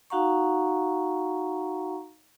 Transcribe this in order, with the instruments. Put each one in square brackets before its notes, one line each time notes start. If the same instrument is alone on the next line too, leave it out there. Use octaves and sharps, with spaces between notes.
[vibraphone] D#4 F#4 F5 F#5 A#5 C#6